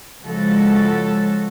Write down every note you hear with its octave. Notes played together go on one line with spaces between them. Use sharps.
C#3 F3 G#3 F#4 A4